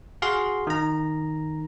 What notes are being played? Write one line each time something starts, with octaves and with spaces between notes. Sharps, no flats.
F#4 G#4 F5 C6
D#3 A#5